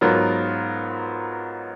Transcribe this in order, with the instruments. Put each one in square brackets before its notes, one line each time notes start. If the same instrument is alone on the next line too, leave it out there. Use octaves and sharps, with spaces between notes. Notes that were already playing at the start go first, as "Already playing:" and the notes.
[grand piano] G#2 F#3 B3 F4 A#4